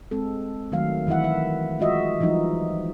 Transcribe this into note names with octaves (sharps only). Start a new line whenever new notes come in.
G#3 C4 A4
D#3 F#3 A3 F5
D#3 E3 E4 E5 F#5
E5
G#3 F4 F#4 D#5 E5
E3 F3 G3 D#4